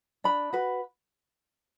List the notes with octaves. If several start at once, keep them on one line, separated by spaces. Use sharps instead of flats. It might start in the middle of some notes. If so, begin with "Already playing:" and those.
D4 B5
F#4 B4